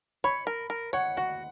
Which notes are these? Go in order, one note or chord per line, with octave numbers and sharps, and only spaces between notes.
C#5 B5
A#4
A#4
C#5 F#5
F#4 F#5